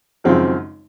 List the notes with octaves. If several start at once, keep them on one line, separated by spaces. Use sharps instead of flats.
G#1 F#2 C#3 F3 C4